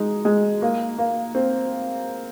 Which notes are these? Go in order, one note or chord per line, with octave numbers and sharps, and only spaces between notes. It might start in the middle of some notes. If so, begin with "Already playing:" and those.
Already playing: G#3 D#4
G#3
A#3
A#3
C4